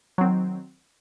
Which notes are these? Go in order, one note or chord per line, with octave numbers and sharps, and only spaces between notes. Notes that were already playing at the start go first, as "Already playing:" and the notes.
D#3 F#3 C4